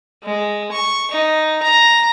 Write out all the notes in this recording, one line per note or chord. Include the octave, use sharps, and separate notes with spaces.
G#3
C#6
D#4
A#5